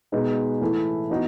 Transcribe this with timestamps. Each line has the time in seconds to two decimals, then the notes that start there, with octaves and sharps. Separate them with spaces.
0.12 B2 G#3 D#4 G#4 B4
0.61 A2 E3 A3 E4
1.10 E3 B3 D#4 F#4